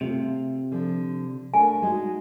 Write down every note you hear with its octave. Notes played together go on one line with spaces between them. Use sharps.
C3 A3 F4
D3 F3
A3 D4 A#4 G#5
G#3 D#4 F#4